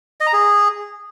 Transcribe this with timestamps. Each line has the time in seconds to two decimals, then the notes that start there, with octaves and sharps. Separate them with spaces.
0.21 D#5
0.27 A#5
0.33 G#4